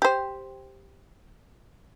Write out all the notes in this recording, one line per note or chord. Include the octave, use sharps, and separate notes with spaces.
G4 C5